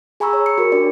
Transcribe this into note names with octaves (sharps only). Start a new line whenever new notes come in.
G#4 G#5 A#5 B5 C#6 E6
C#5
C#7
F#4 A#4
D4 G4 D5